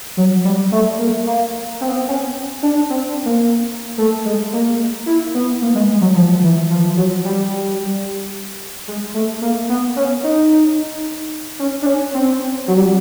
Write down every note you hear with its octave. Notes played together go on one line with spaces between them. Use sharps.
F#3
G3
A3
A#3
A#3
C4
B3
C4
C#4
D4
C4
A#3
A3
G#3
A#3
E4
B3
A#3
G#3
G#3
F#3
F3
E3
F3
F#3
G3
G#3
A3
A#3
B3
C#4
D#4
C#4
D4
C#4
C4
F#3
G3